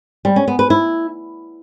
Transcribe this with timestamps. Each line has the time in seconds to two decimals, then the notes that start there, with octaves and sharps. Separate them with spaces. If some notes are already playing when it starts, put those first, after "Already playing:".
0.25 G3
0.36 C#4
0.48 B3
0.59 B4
0.70 E4